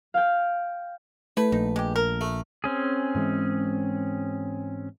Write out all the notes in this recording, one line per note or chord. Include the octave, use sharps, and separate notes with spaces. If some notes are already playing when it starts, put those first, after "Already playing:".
F5 G5
A3 E4 B4
A#1 D#4
G#3 G4
A#4
A3
C4 C#4 G#4
G#2 E3 G#3